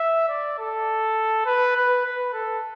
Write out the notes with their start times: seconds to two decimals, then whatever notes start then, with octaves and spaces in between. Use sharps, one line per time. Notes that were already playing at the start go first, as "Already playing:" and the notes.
Already playing: E5
0.28 D5
0.58 A4
1.45 B4
1.76 B4
2.04 B4
2.33 A4